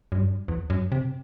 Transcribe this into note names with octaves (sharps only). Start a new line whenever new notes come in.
F#2
G2
E2
F#2
C3